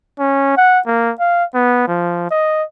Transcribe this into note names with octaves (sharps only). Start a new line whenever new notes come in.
C#4
F#5
A#3
F5
B3
F3
D#5